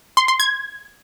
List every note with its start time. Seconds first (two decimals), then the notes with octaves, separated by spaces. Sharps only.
0.17 C6
0.28 C6
0.40 G#6